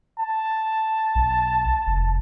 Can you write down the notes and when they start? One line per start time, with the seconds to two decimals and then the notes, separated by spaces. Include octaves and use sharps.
0.19 A5
1.15 B1
1.87 F1